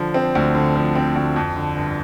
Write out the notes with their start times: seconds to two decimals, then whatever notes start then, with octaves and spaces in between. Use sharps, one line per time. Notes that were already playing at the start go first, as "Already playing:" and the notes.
Already playing: D3 F3
0.14 C4
0.35 D2
0.55 D3
0.76 F3
0.95 C4
1.16 D2
1.36 F2
1.56 D3
1.76 G1